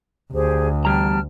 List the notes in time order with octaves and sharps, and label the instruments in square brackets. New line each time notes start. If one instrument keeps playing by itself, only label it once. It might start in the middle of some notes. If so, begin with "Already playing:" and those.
[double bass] D2 [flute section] G4 G#4 C5
[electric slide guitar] E2 G3 A#5 [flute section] G5 A5 F6